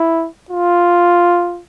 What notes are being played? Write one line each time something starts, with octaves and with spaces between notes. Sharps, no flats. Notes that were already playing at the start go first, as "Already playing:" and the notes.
Already playing: E4
F4